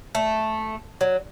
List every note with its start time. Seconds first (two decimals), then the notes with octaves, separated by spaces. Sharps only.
0.15 A3
1.01 F#3